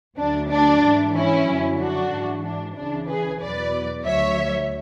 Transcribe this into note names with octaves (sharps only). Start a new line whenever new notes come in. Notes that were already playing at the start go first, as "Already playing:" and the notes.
D2 D3 F#3 D4
D4
G#2 E3
C#4 E4
F#2 D3 F#3
D4 F#4
G#2 E3
D4
C#2 C#3 E3 D4
G#4 B4
E2 B2 F#3 B4 D5
D2 D3 F#3 C#5 E5